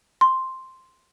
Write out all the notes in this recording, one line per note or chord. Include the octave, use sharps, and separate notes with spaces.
C6